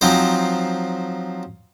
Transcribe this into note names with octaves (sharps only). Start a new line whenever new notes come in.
F3 F#3 C4 D#4 C5